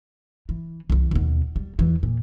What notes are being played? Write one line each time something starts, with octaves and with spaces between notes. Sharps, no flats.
E3
C2 E3
D#2 B2
G3
E2 E3
A#2